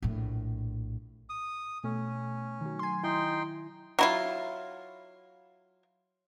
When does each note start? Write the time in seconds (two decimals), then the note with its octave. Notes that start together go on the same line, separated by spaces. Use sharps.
0.02 A#1 A2
1.29 D#6
1.84 B2 A3 C#4
2.61 D#3 F#3
2.79 G#5 C6
3.03 D#4 E4 G5 C6
3.99 F#3 E4 F4